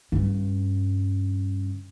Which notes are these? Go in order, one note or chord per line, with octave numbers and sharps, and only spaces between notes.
G2 C#3